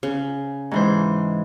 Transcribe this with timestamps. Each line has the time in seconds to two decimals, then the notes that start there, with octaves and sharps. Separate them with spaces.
0.03 C#3
0.71 G#2 E3 C5